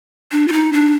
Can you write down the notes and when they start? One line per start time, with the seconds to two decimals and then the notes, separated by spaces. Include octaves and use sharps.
0.32 D4
0.48 F4
0.52 D#4
0.73 D4